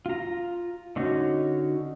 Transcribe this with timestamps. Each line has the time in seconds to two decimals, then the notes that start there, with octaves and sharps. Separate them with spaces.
0.06 F4 A#5
0.96 D3 C#4 D#4 F#4